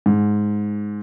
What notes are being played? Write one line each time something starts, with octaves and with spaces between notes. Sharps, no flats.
G#2